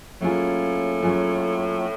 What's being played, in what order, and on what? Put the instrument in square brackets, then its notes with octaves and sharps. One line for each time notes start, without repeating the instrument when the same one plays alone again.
[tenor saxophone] A2 [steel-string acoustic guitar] F#3 A#3 C#4 F4 G#4
[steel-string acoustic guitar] F#3 A#3 C#4 F4 G#4